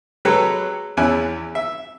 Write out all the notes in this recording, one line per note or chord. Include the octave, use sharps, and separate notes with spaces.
F#3 G#3 G4 A4 B4 C#5
E2 C#4 E4 G#5 F#6
E5